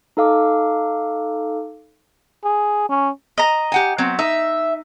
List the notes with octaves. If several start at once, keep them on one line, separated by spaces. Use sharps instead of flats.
D#4 A4 F5 D6
G#4
C#4
D#5 A#5
G4 F#5 G#5
F#3 B3 C4
D#4 E5